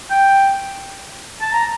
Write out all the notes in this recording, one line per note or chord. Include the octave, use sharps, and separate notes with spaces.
G5
A5
A#5